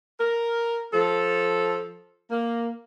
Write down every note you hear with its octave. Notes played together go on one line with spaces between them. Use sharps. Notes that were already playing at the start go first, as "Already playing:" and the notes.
A#4
F3 A4
A#3